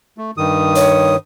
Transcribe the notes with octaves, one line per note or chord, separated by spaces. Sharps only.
A3
G2 D#3 D#6
C#5